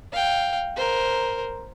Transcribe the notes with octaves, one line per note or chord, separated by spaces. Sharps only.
F5 G5
A#4 C5